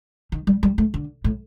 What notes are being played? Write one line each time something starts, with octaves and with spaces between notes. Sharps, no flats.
D#3
G3
G3
A3
D3
A2